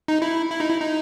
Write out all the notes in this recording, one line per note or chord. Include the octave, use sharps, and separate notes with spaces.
D#4
E4
E4
D#4
E4
D#4